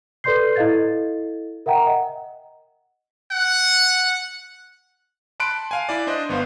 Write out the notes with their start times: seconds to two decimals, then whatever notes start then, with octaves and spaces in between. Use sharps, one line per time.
0.24 A4 B4 D5 C6 G6 C7
0.56 E4 A4 D#5 F5 G#6 A6
1.66 A#4 E5 F#5 G5 A#5
1.85 D#5 F#5
3.31 F#5
5.40 A5 B5 C6 F#6 D7
5.71 F5 G#5
5.89 E4 D5
6.07 D4 C5 D#5
6.29 G1 B3 C5 F5